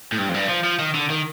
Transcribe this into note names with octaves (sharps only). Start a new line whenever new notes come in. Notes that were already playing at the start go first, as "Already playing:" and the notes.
A2
G2
F2
G2
F3
F3
D#3
D3
D#3